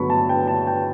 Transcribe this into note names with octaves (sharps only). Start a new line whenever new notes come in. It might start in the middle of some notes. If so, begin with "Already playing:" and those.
Already playing: G2 D3 F#3 B3 D4 B5 C#6
A5
G5
A5
G5